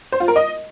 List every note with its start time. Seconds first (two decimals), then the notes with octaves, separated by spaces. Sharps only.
0.12 C5
0.20 F4
0.28 A#4
0.36 D#5